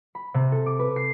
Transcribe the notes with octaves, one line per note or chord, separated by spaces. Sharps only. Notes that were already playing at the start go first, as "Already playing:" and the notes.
B5
C3
A4
D6
B4
C7